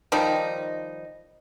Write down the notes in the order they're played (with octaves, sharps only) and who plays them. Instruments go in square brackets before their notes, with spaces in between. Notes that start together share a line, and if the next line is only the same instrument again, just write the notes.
[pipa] D#3 F3 G3 D#4